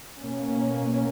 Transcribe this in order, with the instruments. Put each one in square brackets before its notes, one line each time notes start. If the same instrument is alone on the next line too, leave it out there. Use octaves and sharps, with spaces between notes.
[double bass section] B2 A#3 C#4